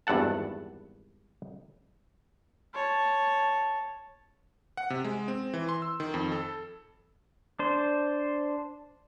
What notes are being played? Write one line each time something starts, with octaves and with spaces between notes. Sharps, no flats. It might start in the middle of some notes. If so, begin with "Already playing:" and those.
G#1 E2 G2 A4 F#5 A5
C#5 A5
F#5
C3
G#3
C4
E3
C6
E6
D#3
F2
A4
D4 C5